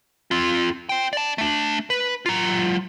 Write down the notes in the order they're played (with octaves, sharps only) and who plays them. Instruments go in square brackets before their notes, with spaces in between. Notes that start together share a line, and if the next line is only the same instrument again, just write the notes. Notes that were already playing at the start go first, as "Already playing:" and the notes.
[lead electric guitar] C4 F4
C5 G5
D5 A5
A3 D4
B4
F#3 F4